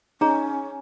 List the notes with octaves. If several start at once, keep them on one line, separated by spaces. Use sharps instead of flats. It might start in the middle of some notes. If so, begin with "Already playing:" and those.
C#4 D#4 G#4 C#5 A#5